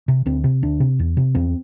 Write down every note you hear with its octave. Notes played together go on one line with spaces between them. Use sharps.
C3
D2 C4
C3
D2 D4
C3
E2
C3
E2 C4